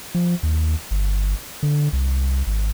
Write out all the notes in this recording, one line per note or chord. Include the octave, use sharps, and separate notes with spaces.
F3
D#2
G1
D3
C2
G#1